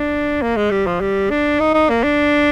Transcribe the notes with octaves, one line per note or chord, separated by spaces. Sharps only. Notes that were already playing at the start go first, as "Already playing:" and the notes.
Already playing: D4
A#3
G#3
G3
F3
G3
D4
D#4
D#4
A#3
D4